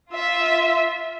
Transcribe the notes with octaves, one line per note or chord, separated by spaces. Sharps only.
F4 E5